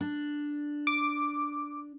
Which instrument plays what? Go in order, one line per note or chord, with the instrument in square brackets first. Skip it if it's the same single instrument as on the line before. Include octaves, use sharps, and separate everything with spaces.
[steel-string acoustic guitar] D4
[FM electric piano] D6